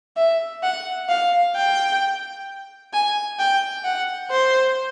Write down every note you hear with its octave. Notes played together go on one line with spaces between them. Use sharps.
E5
F#5
F5
G5
G#5
G5
F#5
C5